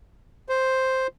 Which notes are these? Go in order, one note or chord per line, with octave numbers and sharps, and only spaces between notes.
C5